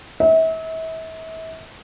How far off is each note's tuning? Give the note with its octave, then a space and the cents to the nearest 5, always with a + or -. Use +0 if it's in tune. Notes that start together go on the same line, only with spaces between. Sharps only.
E5 -35